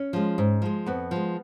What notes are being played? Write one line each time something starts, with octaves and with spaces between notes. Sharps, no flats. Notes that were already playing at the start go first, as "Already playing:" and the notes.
Already playing: C#4
F3 G#3
G#2
F3 G#3
F2 B3
F3 G#3